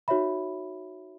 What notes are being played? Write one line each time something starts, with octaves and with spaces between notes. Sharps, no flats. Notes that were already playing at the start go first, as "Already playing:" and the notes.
D#4 F#4 C#5 E5 B5